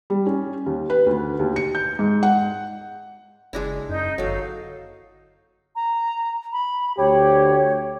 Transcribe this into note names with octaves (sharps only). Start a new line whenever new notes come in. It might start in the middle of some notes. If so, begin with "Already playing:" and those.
G3
C#4
D#2
B4
D2
D#2
C#7
G6
G#2
F#5
F#1 G#3 D4 E4
F#2 D#4 G6
G1 F#3 A4 F5
A#5
B5
D2 G4 C#5